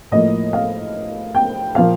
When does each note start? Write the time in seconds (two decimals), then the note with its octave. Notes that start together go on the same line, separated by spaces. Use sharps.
0.11 A2 F3 A#3 D#5
0.53 F5
1.35 G5
1.75 A#2 F3 A#3 F5